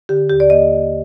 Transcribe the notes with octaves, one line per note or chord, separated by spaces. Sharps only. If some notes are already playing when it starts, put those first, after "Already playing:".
D3 G4
D#2 G4
D5
A#3 D#5